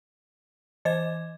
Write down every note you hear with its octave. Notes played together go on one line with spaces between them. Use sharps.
E3 C5 D#5 G#6